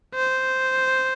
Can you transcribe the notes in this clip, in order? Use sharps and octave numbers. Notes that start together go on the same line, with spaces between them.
C5